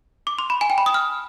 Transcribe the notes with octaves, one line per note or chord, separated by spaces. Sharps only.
D6
C6
B5
G#5
G5
B5
D#6
F6